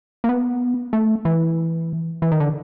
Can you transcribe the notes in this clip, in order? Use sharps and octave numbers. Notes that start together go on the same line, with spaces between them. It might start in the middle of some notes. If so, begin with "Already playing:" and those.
A#3
B3
A3
E3
E3
D#3
D3